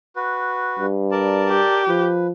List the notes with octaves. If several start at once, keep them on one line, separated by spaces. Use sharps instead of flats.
F#4 B4
G2
A#4 D5 A5
G4
F3 B4